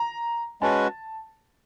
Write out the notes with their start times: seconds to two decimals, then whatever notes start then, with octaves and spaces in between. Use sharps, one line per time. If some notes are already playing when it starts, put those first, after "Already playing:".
Already playing: A#5
0.61 G#3 C#4 F#4 B4 A5